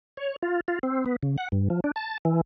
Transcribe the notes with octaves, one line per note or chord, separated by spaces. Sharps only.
C#5
F4
F4
C4
B3
C#3
F#5
G2
F3
D4
A5
E3